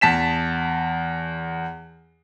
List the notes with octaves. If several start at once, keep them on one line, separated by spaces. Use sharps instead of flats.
E2 A5 B6 E7